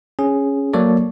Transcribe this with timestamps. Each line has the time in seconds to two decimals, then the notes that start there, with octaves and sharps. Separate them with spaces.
0.19 C#4 G#4
0.74 F#3 A#3 A4 C#5 D5